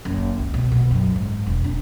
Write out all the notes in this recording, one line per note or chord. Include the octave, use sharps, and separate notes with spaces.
F#1
C#2
B2
B2
F#2
G#2
E1
D4